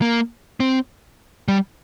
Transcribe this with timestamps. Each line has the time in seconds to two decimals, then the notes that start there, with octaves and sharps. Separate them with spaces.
0.02 A#3
0.60 C4
1.48 G3